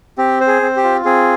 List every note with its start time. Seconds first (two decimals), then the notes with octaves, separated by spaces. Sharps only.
0.18 C4 G4
0.41 C5
0.47 G#4
0.62 C4
0.76 G4
0.84 F4
1.05 C4 G#4